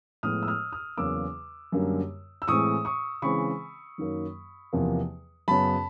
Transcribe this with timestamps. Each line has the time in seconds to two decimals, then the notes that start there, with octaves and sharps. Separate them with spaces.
0.23 A2 F3 G#3 B3 D#6 F6
0.43 E6
0.47 D#6 F6
0.72 D#6 F6
0.97 E2 C#3 F#3 A#3 D6 E6
1.72 F#2 D3 G3 A#3
2.42 E6
2.48 A2 E3 G#3 C4 C#6 D#6
2.85 C#6 D#6
3.22 C#3 E3 G#3 C4 B5 C#6
3.98 F#2 D#3 F#3 A#3
4.73 E2 C3 F3 A#3
5.48 F#2 C#3 F#3 B3 A5 B5